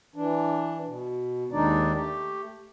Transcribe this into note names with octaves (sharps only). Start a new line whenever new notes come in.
E3 D4
B2
D#2 D#3 G#3 D4 D#4 D5
A3 G4